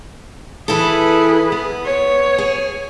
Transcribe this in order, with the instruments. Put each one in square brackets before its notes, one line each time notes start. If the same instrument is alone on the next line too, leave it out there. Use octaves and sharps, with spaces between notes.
[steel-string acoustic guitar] E3 E4 A4 [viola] G#4 B4
[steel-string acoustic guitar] B3
[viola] C#5
[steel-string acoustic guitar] G#4